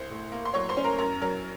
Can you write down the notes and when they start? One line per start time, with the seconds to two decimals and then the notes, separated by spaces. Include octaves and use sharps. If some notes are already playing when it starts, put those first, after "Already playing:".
Already playing: C2 C5 C6
0.10 A2
0.32 A#3
0.45 C6
0.54 F#3 C#5 C#6
0.69 C5 C6
0.77 C#4
0.84 A#4 A#5
0.98 F#2 A#4 A#5
1.21 F#3 A#4 A#5